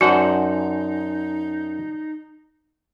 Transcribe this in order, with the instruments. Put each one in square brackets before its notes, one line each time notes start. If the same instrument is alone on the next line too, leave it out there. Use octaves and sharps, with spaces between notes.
[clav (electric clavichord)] F#2 C5 F#5 [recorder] D#4 [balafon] F#4 [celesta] D5 G#5 A5